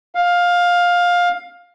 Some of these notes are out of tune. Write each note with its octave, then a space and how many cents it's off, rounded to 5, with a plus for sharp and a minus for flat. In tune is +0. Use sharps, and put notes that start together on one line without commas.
F5 +15